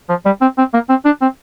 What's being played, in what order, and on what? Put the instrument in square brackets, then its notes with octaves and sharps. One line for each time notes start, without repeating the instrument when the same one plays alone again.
[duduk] F3
G3
C4
C4
A#3
C4
D4
C4